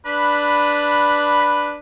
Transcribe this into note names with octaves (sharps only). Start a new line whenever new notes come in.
D4 B4 B5